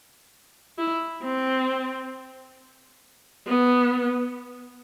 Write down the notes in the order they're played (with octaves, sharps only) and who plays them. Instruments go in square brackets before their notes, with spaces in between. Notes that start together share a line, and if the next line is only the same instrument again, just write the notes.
[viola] E4
C4
B3